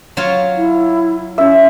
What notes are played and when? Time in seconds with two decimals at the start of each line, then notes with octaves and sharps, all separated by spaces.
0.17 F#3 F4 C#5
0.56 E4
1.38 C#4 E5